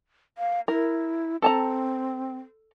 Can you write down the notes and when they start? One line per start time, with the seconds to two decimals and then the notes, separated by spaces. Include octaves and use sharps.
0.38 F5
0.68 E4 A#4
1.42 C4 A4 A5 A#5